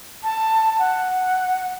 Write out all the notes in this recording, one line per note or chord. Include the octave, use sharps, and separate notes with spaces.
A5
F#5